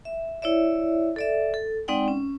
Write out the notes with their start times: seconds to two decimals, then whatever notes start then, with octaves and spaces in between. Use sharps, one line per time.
0.05 E5
0.42 E4 C#5 D5 E5
1.16 A4 D5 E5
1.54 A4
1.88 G#3 C4 D#4 D5 F#5 G5
2.08 C#4